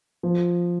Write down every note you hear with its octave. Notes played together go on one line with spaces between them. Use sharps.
F3